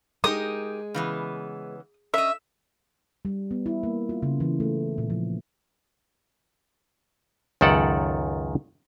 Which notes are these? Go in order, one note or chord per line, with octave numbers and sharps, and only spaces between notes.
G#3 D#4 G4 A#4 D#6
C#3 E3 B3
C#4 D#5 E5
G3
B3
E4
A#3
F4
C#3
E3
A3
A#2
F3
C#2 F#2 D#3 A4 D5 F#5